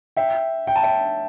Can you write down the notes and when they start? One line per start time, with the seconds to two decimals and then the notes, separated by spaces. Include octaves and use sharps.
0.17 E5 G5
0.67 G5
0.76 A5
0.83 E5 G5